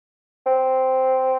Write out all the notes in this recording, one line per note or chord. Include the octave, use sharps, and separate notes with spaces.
C4